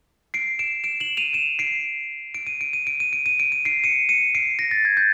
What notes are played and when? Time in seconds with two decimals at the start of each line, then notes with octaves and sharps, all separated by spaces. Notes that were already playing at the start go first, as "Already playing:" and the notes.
0.34 C7 D7
0.59 D7 E7
0.84 D7 E7
1.00 E7 F#7
1.17 D#7 F7
1.33 D7 E7
1.59 C7 D7
2.34 D7
2.47 D#7
2.61 D7
2.73 D#7
2.87 D7
3.00 D#7
3.13 D7
3.26 D#7
3.40 D7
3.52 D#7
3.65 C7 D7
3.84 C#7 D#7
4.09 C#7 D#7
4.35 C7 D7
4.59 A#6
4.71 A6
4.85 G#6
4.97 G6 A6